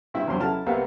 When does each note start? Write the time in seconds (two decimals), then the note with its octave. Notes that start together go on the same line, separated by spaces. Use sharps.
0.14 G2 C4 E4 E5
0.28 E2 G2 F#3 C5 C6
0.39 C#3 F#3 E4 A4 A5 F6
0.66 C2 C3 A#3 B3 E5 F5